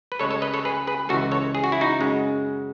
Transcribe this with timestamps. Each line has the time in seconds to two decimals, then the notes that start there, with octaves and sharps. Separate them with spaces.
0.12 B4
0.19 C#2 C#3 G#3 A4 C#5
0.31 A4 C#5
0.42 B4 D#5
0.54 A4 C#5
0.65 G#4 B4
0.87 G#4 B4
1.09 C#2 C#3 E3 F#4 A4
1.31 A4 C#5
1.55 G#4
1.64 F#4
1.72 E4
1.81 D#4 F#4
1.99 F#2 C#3 G#3